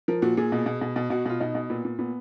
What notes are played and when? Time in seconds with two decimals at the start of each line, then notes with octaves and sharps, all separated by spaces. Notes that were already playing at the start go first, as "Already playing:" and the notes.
0.08 F3 A#4
0.22 A#2 F#4
0.37 A#2 G#4
0.52 B2
0.66 B2
0.81 B2
0.96 B2
1.10 B2 F#4
1.25 B2 F4
1.40 B2 D#4
1.55 B2
1.69 A#2 B3
1.85 A#2
1.99 A#2 B3